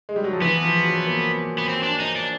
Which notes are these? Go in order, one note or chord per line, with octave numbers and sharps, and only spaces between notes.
G#3
G3
F#3
F3
E3 B3
F3
F#3
A#3
B3
C4
D4
D#4
D4